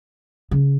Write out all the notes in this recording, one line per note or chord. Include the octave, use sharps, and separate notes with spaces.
C#3